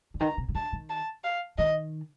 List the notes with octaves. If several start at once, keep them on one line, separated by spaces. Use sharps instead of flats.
D3
D#3 A#5
C3
C3
D3 A5
D#3
A5
F5
D#3 D#5